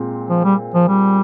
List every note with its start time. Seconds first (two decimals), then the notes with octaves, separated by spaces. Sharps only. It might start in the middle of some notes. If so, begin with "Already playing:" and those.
Already playing: A#2 G#3 C4
0.30 F3
0.44 G3
0.74 F3
0.88 G3